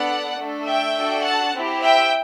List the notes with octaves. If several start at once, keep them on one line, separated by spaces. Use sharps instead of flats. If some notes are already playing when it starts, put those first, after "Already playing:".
Already playing: B3 D4 A4 D5 F#5
A3 D4 A4
E5 G5
D4 F#4 A4
F#5 A5
C4 E4 G4
E5 G5